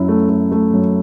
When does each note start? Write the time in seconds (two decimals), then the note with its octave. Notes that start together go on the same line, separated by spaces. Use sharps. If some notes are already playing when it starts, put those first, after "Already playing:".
Already playing: F#2 E4
0.08 A3
0.29 A3
0.52 A3
0.73 F#2